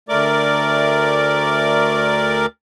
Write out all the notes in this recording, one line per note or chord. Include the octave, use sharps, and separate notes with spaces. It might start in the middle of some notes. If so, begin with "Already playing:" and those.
D2 A3 A#4 D5 D6